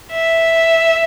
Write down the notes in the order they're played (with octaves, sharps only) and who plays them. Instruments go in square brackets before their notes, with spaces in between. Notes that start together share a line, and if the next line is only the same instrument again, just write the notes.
[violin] E5